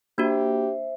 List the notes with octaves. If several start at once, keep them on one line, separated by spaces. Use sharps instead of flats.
A#3 D4 F#4 G4 C5 E5